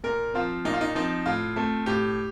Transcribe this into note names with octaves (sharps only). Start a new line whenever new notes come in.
A#2 A#4
F3 C4 F4
A#2 D#4
F4
D#4
F3 C4 D#4
A2 F4
A3 C4
A2 G4